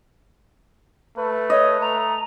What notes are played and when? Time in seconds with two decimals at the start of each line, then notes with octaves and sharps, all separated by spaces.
1.18 A3 B4
1.50 C#5 D#5
1.81 A3 A#5